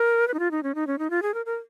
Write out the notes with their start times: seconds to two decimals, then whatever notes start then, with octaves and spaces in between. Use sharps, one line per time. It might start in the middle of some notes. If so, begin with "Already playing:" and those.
Already playing: A#4
0.28 B4
0.34 D#4
0.39 F4
0.51 D#4
0.63 C#4
0.75 D#4
0.87 C#4
0.99 D#4
1.10 F4
1.22 G#4
1.34 A#4
1.46 A#4